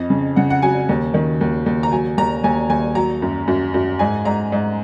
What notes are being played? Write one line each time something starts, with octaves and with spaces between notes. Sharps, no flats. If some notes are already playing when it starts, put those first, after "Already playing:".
Already playing: F2 D#5
C#3
C#3 F#5
F#5
F#3 G#5
D#2
D#3
D#2
D#2
A#5
F#3 G#5
D#2 A#5
D#2 G#5
D#2 G#5
F#3 A#5
F#2
F#2
F#2
G#2 G#5
G#2 A#5
G#2